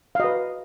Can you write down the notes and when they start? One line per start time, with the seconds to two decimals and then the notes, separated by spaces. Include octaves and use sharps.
0.15 F5
0.20 F#4 D#5
0.24 B4